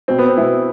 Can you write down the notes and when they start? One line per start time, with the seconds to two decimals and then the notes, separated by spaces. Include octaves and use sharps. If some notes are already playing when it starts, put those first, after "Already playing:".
0.08 B2 C4
0.18 B3
0.28 C4
0.37 B2 E4